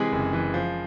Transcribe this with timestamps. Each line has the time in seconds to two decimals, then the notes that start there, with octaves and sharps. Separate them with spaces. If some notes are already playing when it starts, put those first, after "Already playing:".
Already playing: C3 E3 G#3 G#4
0.12 F#1
0.33 E3
0.54 F3